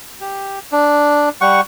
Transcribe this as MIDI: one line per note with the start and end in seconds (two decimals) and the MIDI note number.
0.21 0.59 67
0.72 1.29 62
1.41 1.61 55
1.41 1.61 78
1.41 1.61 85